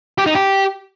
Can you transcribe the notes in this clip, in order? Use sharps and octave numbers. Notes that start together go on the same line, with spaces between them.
G4
D#4
G4